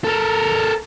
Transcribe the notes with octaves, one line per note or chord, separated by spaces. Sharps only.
A4 A#4